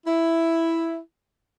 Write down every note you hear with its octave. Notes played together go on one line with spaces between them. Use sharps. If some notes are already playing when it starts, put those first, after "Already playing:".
E4